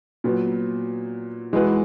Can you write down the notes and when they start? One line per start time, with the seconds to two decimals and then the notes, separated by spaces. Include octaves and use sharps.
0.24 A#2 F#3 B3
1.53 E3 G#3 B3 F#4 B4